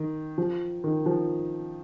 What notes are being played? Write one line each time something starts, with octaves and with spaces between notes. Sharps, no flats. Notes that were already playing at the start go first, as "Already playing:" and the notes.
Already playing: D#3
F3
D#3
F3